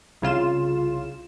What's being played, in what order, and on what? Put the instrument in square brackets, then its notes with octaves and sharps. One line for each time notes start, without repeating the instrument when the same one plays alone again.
[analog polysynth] C2 C#3 F4 E7